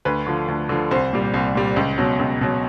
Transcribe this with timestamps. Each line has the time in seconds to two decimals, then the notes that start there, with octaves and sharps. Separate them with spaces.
0.05 D2 B4
0.27 D3 F3
0.48 D2
0.69 D3 F3
0.91 C2 C5
1.13 A#2 G3
1.34 C2
1.55 A#2 G3
1.77 C#2
1.98 B2 F#3
2.19 C#2
2.41 B2 F#3